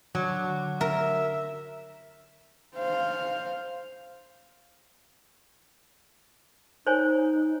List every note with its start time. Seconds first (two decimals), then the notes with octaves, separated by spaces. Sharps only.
0.15 D3 F#3
0.81 A#4 E5
2.76 C5 F5
6.87 D#4 C5 C#5 G#5